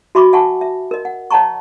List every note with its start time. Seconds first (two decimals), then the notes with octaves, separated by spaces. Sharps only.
0.15 F#4 E5 B5 C#6 D6
0.33 E5 F#5 G#5 A5 C#6
0.61 E5
0.91 A#4 D#5
1.05 F#5
1.31 C#5 D#5 F#5 A5 A#5 C#6